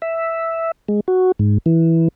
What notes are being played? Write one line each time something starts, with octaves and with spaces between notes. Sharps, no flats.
E5
G#3
F#4
G#2
E3